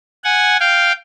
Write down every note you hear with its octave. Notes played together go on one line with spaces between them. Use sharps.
F#5 G#5
F5 G5